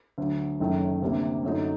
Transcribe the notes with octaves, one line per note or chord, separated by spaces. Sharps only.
D2 D3 F#3
F#1 F#2 D#3 A3
D2 C3 G3 A#3 D4
F#2 D3 F#3 A3 D#4